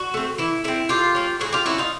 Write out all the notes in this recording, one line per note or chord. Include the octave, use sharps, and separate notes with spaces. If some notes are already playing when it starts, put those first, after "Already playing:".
Already playing: F#4
A3 C4
E3 E4
A3 C4 E4
A2 F4 G4
F#3 A#3 C#4
A2 F#4 G#4
F4 G4
F#3 A#3 C#4 E4 F#4
D#4 F4